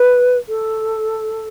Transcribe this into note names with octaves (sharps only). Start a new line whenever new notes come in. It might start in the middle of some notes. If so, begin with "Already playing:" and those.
Already playing: B4
A4